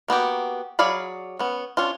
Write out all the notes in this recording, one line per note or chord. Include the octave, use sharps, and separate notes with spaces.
A#3 B3 F#4 G4
F#3 G#4 D5 F5 B5
B3 C#4
C#4 D4 F4